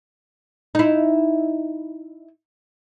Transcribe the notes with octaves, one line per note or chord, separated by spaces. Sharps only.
D#4 E4